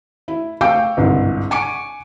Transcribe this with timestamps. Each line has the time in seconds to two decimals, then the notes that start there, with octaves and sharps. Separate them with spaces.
0.28 E4
0.61 F5 G5 C#6 D6 E6 G6
0.97 G1 C2 G#2
1.51 F#5 G#5 C#6 D6 C#7 D7